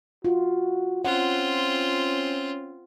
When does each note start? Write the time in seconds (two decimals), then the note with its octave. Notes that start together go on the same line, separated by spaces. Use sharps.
0.25 F4 F#4
1.05 C4 C#4 F4 F#5